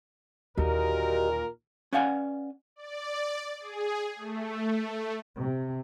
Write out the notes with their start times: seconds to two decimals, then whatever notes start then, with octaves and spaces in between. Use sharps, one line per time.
0.57 D#2 A#2 D3 F#4 G4 A#4 D#5
1.93 C#4 B4 D5 F5 F#5 G#5
2.76 D5
3.60 G#4
4.16 A3
5.38 C3